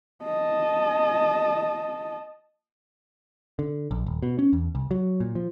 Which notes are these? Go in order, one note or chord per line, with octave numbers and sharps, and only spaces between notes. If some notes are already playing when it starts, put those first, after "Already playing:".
D#5 A5
D3
A#1
D#1
B2
C#4
E2
C2
F#3
A#2
F3